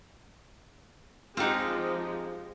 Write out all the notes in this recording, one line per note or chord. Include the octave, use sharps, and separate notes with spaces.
F3 G#3 C4 D#4 F4 G4 F#5